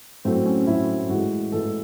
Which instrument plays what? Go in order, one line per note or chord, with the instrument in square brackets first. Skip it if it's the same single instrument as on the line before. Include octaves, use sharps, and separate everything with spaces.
[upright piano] A2 F#3 A3 C4
C#4
A2 F#3 A3 E4
A2 E3 G#3 F#4
A2 E3 G#3 A4